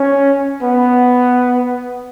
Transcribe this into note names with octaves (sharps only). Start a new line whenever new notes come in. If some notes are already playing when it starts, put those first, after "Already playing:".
Already playing: C#4
B3